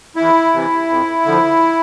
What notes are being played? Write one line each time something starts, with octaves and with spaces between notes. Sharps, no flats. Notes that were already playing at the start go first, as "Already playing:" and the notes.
E2 E4
C3 E3
F2
D3 F3